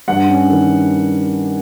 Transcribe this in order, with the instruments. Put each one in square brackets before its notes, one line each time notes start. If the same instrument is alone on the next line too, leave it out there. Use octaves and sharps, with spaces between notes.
[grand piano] G2 F#5
C#4
D#3